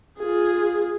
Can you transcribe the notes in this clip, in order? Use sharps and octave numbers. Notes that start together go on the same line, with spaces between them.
F4 G#4